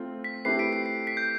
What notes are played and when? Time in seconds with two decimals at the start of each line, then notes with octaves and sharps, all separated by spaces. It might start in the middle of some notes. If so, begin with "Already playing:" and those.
Already playing: A3 C4 F4
0.24 B6
0.45 A3 C4 E4 G4 B4 C7
0.59 B6 D7
0.73 C7
0.86 C7
1.07 B6
1.17 G6